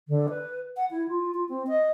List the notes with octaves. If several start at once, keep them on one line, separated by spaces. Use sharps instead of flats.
D3
B4
F#5
E4
F4
F4
C4
D#5